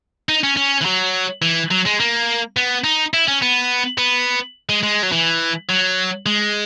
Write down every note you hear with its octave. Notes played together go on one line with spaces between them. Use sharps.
D#4
C#4
C#4
E3
F#3
E3
F#3
G#3
A#3
B3
D#4
E4
C#4
B3
B3
G#3
G#3
F#3
E3
F#3
G#3